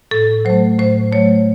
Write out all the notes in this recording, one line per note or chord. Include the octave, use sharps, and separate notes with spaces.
A2 A4
F#3 A3 C5
A2 C5
F#3 A3 C#5